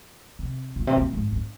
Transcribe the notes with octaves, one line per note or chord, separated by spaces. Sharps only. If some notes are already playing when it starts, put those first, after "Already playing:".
C3
A#2
C3
A#2
G#2
G#2